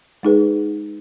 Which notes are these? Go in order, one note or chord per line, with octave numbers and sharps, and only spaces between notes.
G#3 D#4 G#4 B4